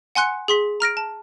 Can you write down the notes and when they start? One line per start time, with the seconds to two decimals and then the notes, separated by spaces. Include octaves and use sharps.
0.15 F#5 G#5 C6 F#6 C#7
0.48 G#4 C6 B6
0.80 A#5 F6 A#6 D7
0.97 A5